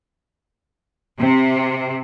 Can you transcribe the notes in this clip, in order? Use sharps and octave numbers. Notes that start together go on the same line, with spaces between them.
C3